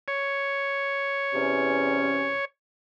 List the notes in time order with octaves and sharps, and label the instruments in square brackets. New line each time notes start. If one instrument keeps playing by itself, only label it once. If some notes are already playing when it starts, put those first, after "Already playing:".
[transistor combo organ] C#5
[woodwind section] E2 C3 C#4